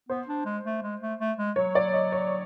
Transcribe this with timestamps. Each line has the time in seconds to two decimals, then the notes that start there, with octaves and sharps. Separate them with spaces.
0.09 B3 C5
0.28 D4
0.46 G#3
0.65 A3
0.83 G#3
1.01 A3
1.20 A3
1.38 G#3
1.56 F#3 C#5
1.75 D5
1.93 D#5
2.12 C#5